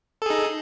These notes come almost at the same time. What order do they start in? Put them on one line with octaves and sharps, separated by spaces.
A4 G#4 D#4